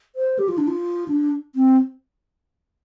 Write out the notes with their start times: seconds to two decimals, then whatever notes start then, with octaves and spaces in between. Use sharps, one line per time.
0.16 C5
0.39 G4
0.49 F4
0.58 D4
0.68 F4
1.08 D4
1.55 C4